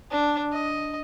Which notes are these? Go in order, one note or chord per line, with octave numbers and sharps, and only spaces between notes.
D4
D#5